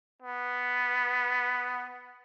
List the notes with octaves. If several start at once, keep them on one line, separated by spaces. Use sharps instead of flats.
B3